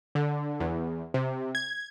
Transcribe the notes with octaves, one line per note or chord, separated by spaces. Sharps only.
D3
E2
C3
G#6